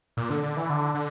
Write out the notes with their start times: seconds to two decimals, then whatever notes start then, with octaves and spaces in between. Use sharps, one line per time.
0.17 A#2
0.30 D3
0.43 D3
0.57 E3
0.70 D3
0.94 D3